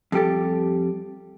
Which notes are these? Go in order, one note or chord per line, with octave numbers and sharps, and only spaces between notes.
F2 G3 G4 A4